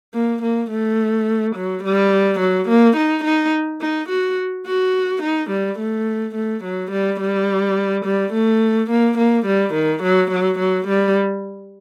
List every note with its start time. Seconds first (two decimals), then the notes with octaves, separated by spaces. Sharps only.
0.14 A#3
0.43 A#3
0.71 A3
1.56 F#3
1.84 G3
2.40 F#3
2.69 A#3
2.97 D#4
3.24 D#4
3.81 D#4
4.09 F#4
4.66 F#4
5.23 D#4
5.50 G3
5.79 A3
6.35 A3
6.64 F#3
6.92 G3
7.21 G3
8.05 G3
8.33 A3
8.90 A#3
9.18 A#3
9.46 G3
9.74 D#3
10.03 F#3
10.31 F#3
10.59 F#3
10.88 G3